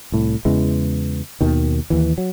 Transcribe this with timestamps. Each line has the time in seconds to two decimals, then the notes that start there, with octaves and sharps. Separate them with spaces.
0.12 C2 A2
0.45 E2 C#3 E3 G#3
1.41 D#2 B2 D#3
1.90 D#2 E3
2.18 F#3